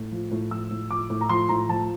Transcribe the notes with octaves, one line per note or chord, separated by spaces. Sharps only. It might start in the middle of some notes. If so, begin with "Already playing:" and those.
Already playing: A2
F3
A2
F3 E6
A2
F3 D6
A2
A#5
F3 C6
A2 A#5
F3 A5